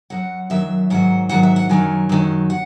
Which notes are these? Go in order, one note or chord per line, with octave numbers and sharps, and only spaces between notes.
F#2 D#3 F#3 F#5
F#2 D#3 F#3 E5
G#2 D#3 F#3 F#5
G#2 D#3 F#3 F#5
E5
F#5
F#2 D#3 F#3 G#5
F#2 D#3 F#3
F#5